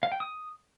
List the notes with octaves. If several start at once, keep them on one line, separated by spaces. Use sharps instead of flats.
F5
G5
D#6